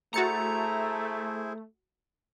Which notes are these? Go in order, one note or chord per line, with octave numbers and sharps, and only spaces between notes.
A3 E4 F#4 G#4 C5 A#5 A6 C#7